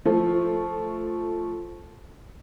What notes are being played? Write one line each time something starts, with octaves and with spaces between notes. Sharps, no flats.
F3 A3